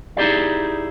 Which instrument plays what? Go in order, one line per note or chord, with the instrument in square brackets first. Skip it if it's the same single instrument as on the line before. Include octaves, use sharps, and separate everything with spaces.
[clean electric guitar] D#4 E4 G4 G#4 D5